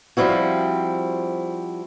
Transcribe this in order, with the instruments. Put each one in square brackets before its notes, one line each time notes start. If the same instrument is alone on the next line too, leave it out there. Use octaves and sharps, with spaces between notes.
[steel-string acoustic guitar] F3 G3 C4 E4 F#4